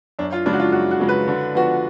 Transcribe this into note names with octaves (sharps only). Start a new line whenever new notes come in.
F#2 D4
F4
C#3 F3 G#3 D4
F#4
F4
F#2 F#4
F#4
C#3 F3 G#3
B4
D3
F3 B3 F#4